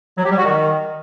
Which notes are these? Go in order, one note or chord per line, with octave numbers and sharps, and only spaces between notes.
F#3
G4
G3
F#4
D#3